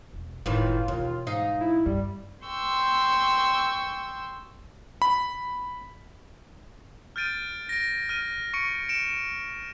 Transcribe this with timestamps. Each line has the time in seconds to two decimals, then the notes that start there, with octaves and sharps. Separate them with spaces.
0.13 E1
0.46 F#1 A2 D#3 E3 F4
0.88 D#2 B2 E3
1.27 G#2 D#4 F5
1.61 E4
1.86 G2 G3
2.44 G5 C6 C#6 E6 G6
5.02 B5
7.16 F6 G6 A6 D7 D#7
7.69 A#6 D7
8.09 F6 D#7
8.54 C#6 C#7 D7
8.89 C#7 D7 E7